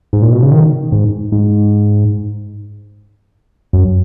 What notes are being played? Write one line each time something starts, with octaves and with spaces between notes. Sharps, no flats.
G#2
A#2
B2
C#3
D#3
G#2
G#2
F#2